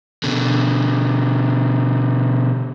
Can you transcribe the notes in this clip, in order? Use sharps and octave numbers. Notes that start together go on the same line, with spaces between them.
B2 D3